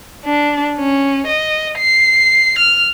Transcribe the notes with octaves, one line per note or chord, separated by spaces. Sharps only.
D4
C#4
D#5
C7
F6